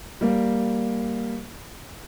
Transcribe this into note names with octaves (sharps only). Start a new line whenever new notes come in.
G3 A#3